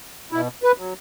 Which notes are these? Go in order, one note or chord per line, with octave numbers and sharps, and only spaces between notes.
B2 E4
B4
F#3